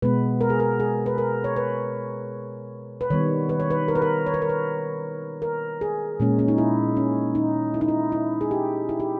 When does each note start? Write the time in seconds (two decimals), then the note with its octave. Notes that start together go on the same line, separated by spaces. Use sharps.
0.02 B2 G#3 B3 B4
0.41 A#4
0.50 G#4
0.60 A#4
0.80 G#4
1.06 B4
1.18 A#4
1.44 C#5
1.56 B4
3.01 B4
3.10 D#3 G3 B3 C#5
3.49 B4
3.60 C#5
3.70 B4
3.88 A#4
3.95 B4
4.02 A#4
4.26 C#5
4.34 B4
4.42 A#4
4.49 B4
5.42 A#4
5.81 G#4
6.20 A#2 G#3 C#4
6.39 C#4
6.48 D#4
6.58 E4
6.97 C#4
7.35 D#4
7.74 E4
7.81 D#4
7.88 E4
8.12 E4
8.41 G#4
8.51 G4
8.89 E4
9.00 G4